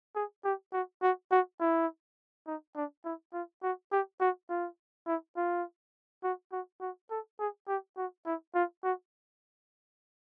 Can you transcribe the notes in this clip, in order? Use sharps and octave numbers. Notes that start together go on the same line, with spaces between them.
G#4
G4
F#4
F#4
F#4
E4
D#4
D4
E4
F4
F#4
G4
F#4
F4
E4
F4
F#4
F#4
F#4
A4
G#4
G4
F#4
E4
F4
F#4